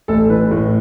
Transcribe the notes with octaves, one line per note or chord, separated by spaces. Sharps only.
A1 A4
E3 B4
A2